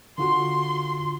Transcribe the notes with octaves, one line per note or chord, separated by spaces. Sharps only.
D3 F4 F#4 C6